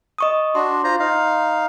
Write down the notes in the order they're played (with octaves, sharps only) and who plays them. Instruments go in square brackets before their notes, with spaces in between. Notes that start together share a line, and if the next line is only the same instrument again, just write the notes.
[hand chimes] D#5 C#6 D#6
[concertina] D4 F#4 [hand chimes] C6
[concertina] F4 C5 A#5
D#4 F5